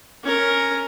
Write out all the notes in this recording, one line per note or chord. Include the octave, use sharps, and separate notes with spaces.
C#4 A#4